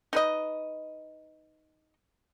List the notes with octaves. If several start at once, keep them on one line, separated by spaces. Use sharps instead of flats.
D#4 B4 D#5